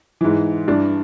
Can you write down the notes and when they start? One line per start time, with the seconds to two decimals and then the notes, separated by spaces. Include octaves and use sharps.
0.21 G#2 E3
0.68 G2 E3 D4